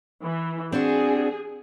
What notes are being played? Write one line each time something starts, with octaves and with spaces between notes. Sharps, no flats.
E3
C4 D4 F#4 G#4